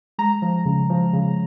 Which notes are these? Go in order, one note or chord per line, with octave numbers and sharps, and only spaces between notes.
G#3 A#5
F3
C#3
F3
C#3